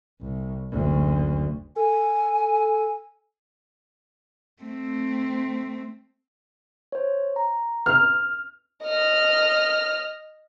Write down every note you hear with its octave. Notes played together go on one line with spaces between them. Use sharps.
C2
F#1 D2
A4 G#5
A3 C4
C5 C#5
A#5
F6
D#5 F6